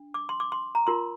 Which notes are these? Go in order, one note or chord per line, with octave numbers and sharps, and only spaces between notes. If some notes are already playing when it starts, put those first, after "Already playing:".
Already playing: D4
D6
C6
D6
C6
A#5
F4 A#4 C6